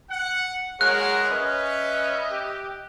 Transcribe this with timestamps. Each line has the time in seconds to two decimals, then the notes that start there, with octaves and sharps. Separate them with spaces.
0.10 F#5
0.81 G#3 G#4 A#4 C#5 F#5 F#6
1.29 C#4 B4 D#5 E5
2.31 G4